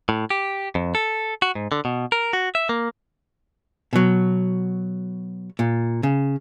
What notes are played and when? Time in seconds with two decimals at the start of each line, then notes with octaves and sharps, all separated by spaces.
0.09 A2
0.30 G4
0.75 F2
0.95 A4
1.42 F#4
1.55 G#2
1.72 D3
1.85 B2
2.12 A#4
2.33 F#4
2.55 E5
2.69 A#3
3.93 B2 F#3
5.59 A#2
6.03 C#3